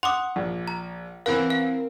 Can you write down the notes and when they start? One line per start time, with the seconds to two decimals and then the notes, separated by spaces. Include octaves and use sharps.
0.03 F#5 C6 D6 D#6
0.36 A#1
0.68 A#5
1.26 E3 B3 C4 A#4 F5 F#6
1.50 F5